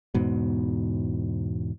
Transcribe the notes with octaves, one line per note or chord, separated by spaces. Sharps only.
E2 G#2 B2